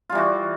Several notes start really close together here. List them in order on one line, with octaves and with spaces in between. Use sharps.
F4 G3 E3 F#4